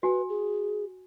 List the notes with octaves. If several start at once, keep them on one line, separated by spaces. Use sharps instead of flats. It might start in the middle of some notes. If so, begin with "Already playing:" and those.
F#4 B4 G#5
G#4